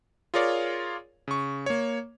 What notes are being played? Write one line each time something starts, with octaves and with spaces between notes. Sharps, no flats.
F4 G#4 A#4 C#5 D5 F5
C#3 C#6
A#3 C#5